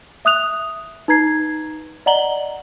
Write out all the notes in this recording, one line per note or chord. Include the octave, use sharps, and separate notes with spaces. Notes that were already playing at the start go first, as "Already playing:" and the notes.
E5 D#6 F#6 F7
D#4 B4 A#5 G#6 C7
D5 D#5 F#5 A#5 F#7 G7